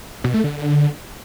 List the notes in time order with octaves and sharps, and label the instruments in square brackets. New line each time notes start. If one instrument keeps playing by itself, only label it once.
[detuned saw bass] B2
A3
D3